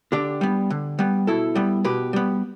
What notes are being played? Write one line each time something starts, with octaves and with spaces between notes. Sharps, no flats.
D3 D4 G4
G3 B3
D3
G3 B3
B2 E4 A4
G3 B3
B2 G4 B4
G3 B3